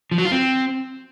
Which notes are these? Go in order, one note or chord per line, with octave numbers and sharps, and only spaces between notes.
F3
F#3
F4
C4